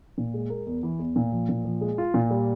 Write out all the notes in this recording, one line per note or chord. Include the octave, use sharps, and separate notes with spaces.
A#2
G#3
A#4
E2
E3
E2
A#2
F3
A#2
F3
G#3
F4
A#2
G3